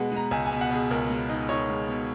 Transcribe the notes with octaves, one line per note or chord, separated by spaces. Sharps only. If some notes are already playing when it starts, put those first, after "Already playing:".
Already playing: B2 G#3 B4 F#5
G#3 A#5
C#2 G#5
G#5
B2
F#5
B2 G#4
C#2 A#4
G#3
D#4
D#4 C#5
G#3
B2